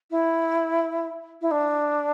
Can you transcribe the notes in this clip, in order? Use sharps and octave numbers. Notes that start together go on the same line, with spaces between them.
E4
E4
D4